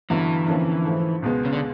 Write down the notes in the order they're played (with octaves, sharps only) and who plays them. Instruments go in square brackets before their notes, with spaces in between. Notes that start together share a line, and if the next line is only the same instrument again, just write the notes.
[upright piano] G1 G2 D3 F#3 [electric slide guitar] E3
[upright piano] F2 D3 F3 A#3 C#4
G#2 F3 A3
C#2 B2 G#3 B3
[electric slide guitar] C#3
D3